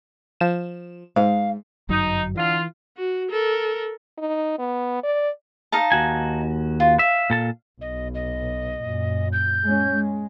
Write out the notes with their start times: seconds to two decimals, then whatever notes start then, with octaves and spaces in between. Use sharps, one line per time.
0.41 F3 E7
1.16 G#2 F5
1.89 G1 F#2 F#3 D#4
2.36 D3 E3 F4
2.97 F#4
3.31 A4 A#4
4.18 D#4
4.59 B3
5.03 D5
5.72 D#4 F5 A5
5.92 D#2 F#4 G#5
6.80 F4
6.99 E5 F5
7.30 A#2 A4 A5
7.81 B1 D#5
8.14 D#5
8.80 F#2 A#2
9.33 G6
9.63 G#3 C#4
9.94 G#3